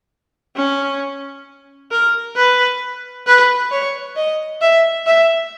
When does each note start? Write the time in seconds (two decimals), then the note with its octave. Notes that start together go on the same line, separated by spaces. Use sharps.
0.56 C#4
1.91 A#4
2.36 B4
3.26 B4
3.71 C#5
4.16 D#5
4.61 E5
5.06 E5